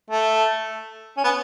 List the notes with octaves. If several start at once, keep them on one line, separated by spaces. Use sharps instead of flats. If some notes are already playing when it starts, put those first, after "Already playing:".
A3
C#4
B3